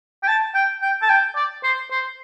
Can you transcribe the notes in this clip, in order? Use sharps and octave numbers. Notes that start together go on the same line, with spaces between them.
G5
A5
G5
G5
A5
G5
D5
C5
C5